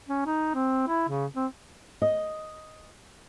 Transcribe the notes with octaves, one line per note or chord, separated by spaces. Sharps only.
C#4
D#4
C4
E4
C#3
C4
D#5